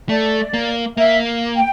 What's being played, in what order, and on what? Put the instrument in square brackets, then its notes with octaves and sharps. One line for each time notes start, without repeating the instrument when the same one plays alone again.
[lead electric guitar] A3 [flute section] D5
[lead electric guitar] A#3
[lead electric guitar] A#3 [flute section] E5
[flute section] G5